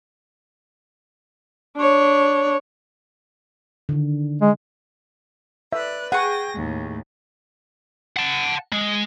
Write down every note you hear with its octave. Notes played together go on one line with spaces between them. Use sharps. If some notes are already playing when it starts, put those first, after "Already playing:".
D4 C#5
D3 D#3
G#3
B4 D5 E5 F#6
G#4 F#5 G5 C#6 A#6
D#2 A2
F#5 A5
G#3